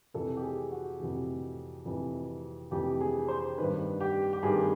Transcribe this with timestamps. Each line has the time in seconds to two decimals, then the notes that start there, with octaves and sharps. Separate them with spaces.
0.14 F2 C3 E3 A4
0.36 G4
0.42 G#4
0.71 F#4
1.00 F2 C3 E3
1.86 F2 C3 E3
2.71 F2 C3 E3 G4
3.01 G#4
3.28 C5
3.58 G2 D#3 B4
4.00 G4
4.33 G4
4.43 G2 D#3 G#4